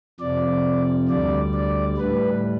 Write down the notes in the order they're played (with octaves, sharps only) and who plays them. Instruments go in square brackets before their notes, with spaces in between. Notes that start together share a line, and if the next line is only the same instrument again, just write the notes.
[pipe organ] F2 C3 F3 D5
D2 D3 G3 D5
D5
A2 G3 B4